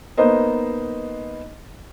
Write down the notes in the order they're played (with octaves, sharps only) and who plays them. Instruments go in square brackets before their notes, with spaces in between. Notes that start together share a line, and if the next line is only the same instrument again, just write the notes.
[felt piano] A#3 B3 D#4 C5 D#5